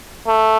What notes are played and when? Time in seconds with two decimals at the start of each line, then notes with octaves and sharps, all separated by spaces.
0.28 A3